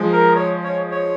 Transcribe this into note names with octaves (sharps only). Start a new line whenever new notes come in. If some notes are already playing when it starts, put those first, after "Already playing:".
Already playing: F3 G#3
A#4
C#5
C#5
C#5